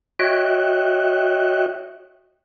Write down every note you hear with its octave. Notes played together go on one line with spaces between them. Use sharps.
F#4 C#5 D#5 E5 G5 F#6